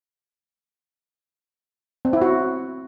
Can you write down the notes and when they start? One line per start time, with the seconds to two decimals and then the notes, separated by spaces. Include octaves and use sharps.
2.05 C4
2.13 E4
2.22 F#4